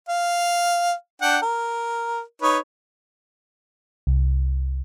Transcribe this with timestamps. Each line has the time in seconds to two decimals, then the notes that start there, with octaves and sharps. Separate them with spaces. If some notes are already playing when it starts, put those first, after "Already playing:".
0.09 F5
1.22 D4 F#5 G5
1.42 A#4
2.42 D#4 B4 C#5
4.07 C2